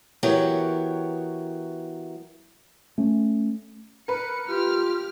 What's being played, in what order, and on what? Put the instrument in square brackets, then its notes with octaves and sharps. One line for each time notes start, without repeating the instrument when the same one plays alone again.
[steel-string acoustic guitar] E3 F#3 B3 G4 A#4 C#5
[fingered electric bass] A3 C#4
[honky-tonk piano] A#4 B4 [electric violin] C#7
[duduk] F4 [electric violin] G4 F6